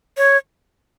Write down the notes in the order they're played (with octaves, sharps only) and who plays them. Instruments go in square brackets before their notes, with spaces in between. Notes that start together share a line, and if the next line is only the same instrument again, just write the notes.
[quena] C#5